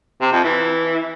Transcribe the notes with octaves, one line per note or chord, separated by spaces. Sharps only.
C3
F2
E3